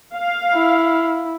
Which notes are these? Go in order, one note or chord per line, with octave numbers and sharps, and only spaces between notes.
F5
E4